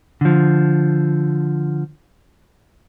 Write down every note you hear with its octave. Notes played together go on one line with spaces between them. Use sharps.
D3 F3